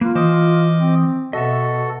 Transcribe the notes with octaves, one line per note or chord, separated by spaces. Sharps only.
A#3 F4 B4
E3 C5 D#5 D6
C4
B2 F#4 A4 D#5 E5